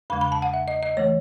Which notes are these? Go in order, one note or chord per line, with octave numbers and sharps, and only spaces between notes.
E2 C#3 G#3 B5
B5
A5
F#5
E5
D#5
D#5
E3 A3 C#5